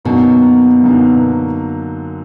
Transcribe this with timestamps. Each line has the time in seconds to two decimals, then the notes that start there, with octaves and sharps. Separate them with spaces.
0.05 F#2 B2 D3 F#3 A#3 D#4
0.83 F#2 D3 F#3 A#3 D#4